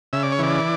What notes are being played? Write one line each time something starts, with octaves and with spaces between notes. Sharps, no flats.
C#3 E5
D5
C#5
E3 D5